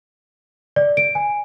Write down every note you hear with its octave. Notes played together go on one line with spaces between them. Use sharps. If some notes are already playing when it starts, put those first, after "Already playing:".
D5
D7
G#5